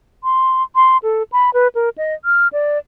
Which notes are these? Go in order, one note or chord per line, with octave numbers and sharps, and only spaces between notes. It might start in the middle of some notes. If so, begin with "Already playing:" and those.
C6
C6
A4
B5
B4
A#4
D#5
F6
D5